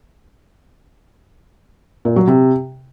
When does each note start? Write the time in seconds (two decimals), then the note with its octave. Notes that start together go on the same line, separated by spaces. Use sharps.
2.05 A#2
2.16 F#3
2.27 C3